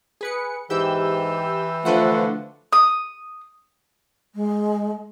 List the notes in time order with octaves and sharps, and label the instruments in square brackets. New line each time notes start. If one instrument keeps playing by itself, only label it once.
[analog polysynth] G#4 B4 C#7
[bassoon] G#2 [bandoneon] E3 [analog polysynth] G4 E6 G6
[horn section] D3 F3 A3 [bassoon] F4 [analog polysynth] B4 C5 F#5
[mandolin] D#6
[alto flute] G#3